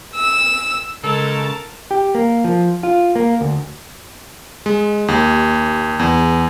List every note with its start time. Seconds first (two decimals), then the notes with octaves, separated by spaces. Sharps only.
0.16 E6
1.04 C#3 G#3 A4 A#4 A5
1.91 G4
2.15 A#3
2.44 F3
2.83 F4
3.15 A#3
3.41 D2
4.66 G#3
5.08 D#2
5.99 E2